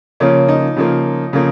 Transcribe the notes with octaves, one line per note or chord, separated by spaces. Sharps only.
C#3 F3 A#3 C#4
D#4
C#3 F3 A#3
C#3 F3 A#3